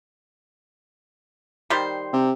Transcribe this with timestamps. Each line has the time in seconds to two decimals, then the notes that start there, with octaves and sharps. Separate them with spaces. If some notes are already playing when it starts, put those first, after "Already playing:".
1.70 D#3 G3 C5
2.13 C3